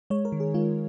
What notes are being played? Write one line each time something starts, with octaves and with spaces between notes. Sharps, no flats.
G#3 C#5
A#4
D#3
G#4
G#3 F4